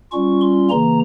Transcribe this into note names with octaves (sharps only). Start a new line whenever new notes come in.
G3 C#4 F4 C#6
C6
C#3 E3 A#3 A#5